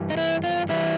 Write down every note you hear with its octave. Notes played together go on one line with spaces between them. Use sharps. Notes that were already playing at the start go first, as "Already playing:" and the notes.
Already playing: G2 E3 G3
D#4
E4
F4
E3 G3 E4